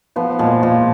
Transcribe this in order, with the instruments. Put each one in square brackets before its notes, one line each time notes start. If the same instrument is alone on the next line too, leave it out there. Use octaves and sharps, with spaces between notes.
[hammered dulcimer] F3 [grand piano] B3
[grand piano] A#2 [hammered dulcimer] F3 G#3
[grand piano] A#2 [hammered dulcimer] F3